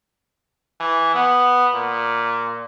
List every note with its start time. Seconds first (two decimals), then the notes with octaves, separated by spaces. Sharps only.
0.80 E3
1.14 B3
1.74 A#2